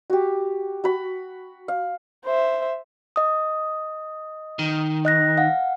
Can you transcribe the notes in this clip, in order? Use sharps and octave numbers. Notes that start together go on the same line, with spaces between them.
F#4 G4
F#4 B5
F5
C5 E5
D#5 D#6
D#3
D#5 F#6 A#6
F5 F#5